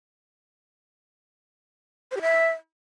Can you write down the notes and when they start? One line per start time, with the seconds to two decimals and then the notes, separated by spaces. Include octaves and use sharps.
2.11 C5
2.17 G4
2.22 E5